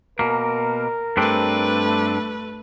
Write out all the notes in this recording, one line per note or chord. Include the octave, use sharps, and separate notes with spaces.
B2 A#3 A#4
G2 A3 C4 D4 B4